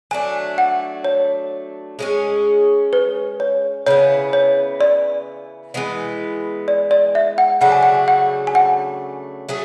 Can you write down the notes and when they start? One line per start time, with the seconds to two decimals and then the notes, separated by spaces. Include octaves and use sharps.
0.11 F#3 A3 D4 G#5
0.58 F#5
1.05 C#5
1.99 G#3 C#4 G#4
2.93 B4
3.40 C#5
3.87 C#3 E3 B3 C#5
4.33 C#5
4.81 D5
5.74 E3 G#3 B3
6.68 D5
6.91 D5
7.15 E5
7.38 F#5
7.61 C#3 F#3 A3 D4 F#5
7.72 G#5
7.83 F#5
8.08 F#5
8.47 G#5
8.55 F#5
9.48 F#3 A3 C#4 G#4